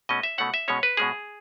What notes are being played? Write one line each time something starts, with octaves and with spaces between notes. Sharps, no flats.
B2 A3 C#4 D#5
E5
B2 A3 C#4 F#5
E5
B2 G#3 C#4 C#5
B4
B2 G#3 C#4 G#4